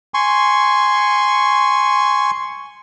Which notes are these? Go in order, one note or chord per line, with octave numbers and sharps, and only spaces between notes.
G#5 C6 C#6